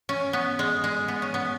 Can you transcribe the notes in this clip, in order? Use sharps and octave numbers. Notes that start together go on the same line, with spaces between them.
C#4
B3
G#3
G#3
B3
C#4
B3